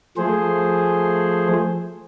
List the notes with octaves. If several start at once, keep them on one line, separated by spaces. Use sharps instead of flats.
F3 A3 G#4 C5